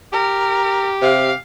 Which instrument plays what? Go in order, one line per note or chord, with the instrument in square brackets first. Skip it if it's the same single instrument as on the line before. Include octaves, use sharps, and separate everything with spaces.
[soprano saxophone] G4 [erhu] A#4
[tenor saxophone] C3 [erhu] F5